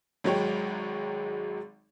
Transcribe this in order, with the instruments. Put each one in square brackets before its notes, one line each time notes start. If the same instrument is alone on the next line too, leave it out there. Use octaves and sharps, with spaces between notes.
[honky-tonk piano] G#1 F#3 G#3 C#5 G5